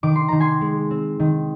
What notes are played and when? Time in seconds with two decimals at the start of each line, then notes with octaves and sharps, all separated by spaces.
0.03 D#3 D6
0.16 C6
0.28 D#3 A#5
0.40 G#5 C6
0.61 G#3
0.91 C4
1.20 D#3